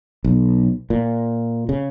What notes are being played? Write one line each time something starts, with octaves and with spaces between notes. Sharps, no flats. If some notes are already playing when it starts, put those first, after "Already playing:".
B1
A#2
C#3